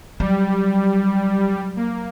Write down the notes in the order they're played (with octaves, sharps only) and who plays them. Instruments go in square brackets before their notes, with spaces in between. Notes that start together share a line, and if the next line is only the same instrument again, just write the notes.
[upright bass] F#3 [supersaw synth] G3
[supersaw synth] A#3